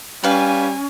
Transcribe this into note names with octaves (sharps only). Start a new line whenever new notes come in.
G3 C#4 B4 F5 G#5